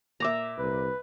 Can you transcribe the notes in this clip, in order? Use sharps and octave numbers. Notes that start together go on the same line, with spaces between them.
A#2 E5 A#5 D6
C2 B4